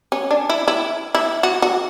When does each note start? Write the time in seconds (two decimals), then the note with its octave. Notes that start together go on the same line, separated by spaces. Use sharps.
0.12 C#4
0.31 D4
0.49 E4
0.68 E4
1.15 E4
1.43 F#4
1.62 F#4